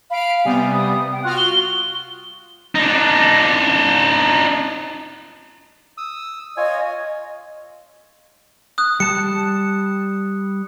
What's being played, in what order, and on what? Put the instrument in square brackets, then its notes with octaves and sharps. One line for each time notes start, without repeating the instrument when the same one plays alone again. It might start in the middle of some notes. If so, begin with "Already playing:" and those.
[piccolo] F5 [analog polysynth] B5 D7
[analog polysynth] C3 G3 B3 [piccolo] G#5
[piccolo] D#6
G5
[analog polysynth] F4 F#4 F6 [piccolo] F#6
[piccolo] G7
[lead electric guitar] D4 D#4
[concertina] D#6 E6
[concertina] F4 C#5 G#5 [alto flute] D#5
[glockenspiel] D#6 F#6
[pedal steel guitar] G3 A5 F#6 [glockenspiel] C#7